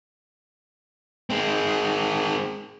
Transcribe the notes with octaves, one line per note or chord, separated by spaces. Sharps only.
G#3 C4